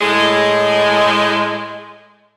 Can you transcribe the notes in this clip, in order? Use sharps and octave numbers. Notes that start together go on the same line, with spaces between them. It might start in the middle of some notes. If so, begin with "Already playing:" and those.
A2 G#3